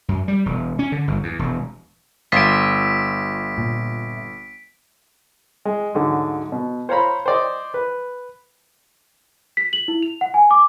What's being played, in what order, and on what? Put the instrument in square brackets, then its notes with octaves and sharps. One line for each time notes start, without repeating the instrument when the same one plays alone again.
[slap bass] F#2
G3
E1
C#4
D3
G1
E2
E1
[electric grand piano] G1 [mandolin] F4 E5 [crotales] B6 D7
[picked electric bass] A#2
[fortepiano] G#3
D2 G#2 D3 F#3
B2
C5 C#5 F5 A#5 B5
C5 D5 D#5
B4
[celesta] B6
F#7
E4
F7
F#5
G#5
D6